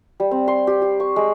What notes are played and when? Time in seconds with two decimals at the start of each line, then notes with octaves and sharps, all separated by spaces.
0.20 G3
0.31 C4
0.48 C6
0.67 G4
0.82 G4
1.00 C#6
1.16 G#3